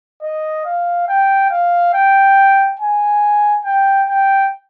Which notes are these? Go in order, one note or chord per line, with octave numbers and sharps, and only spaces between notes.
D#5
F5
G5
F5
G5
G#5
G5
G5